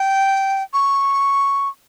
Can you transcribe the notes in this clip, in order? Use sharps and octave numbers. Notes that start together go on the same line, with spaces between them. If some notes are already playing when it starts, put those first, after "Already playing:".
Already playing: G5
C#6